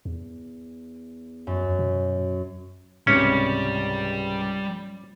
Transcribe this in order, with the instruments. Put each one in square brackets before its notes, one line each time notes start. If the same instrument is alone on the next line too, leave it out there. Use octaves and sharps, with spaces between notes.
[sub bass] E2
[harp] F#2
[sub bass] B2
[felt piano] C#2 G#2 C3 [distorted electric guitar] G3 [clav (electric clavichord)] C#4